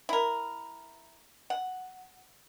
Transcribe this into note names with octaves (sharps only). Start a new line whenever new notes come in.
E4 A#4
F#5